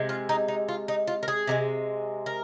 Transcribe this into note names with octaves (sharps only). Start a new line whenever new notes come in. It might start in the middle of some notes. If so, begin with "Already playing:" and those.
Already playing: C3 G#3
F4
D#4
D#4
F4
D#4
F4
A#4
G#4
C3 D#3 G#3
A#4